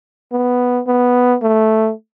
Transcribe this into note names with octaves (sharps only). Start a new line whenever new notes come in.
B3
B3
A3